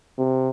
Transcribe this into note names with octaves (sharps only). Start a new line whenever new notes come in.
C3